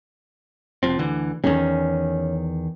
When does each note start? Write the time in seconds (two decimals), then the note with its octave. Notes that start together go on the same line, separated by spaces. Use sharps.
0.83 F1 F3 C4
0.98 D2 D3 E3
1.44 E2 D#3 C#4